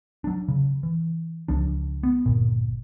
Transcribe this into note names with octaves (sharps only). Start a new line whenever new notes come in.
F#3 D4
C#3
E3
C#2 F3 D4
B3
D1 G1 A#2